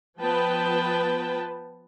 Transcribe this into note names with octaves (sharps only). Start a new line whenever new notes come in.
F3 B3 B4 G5 A5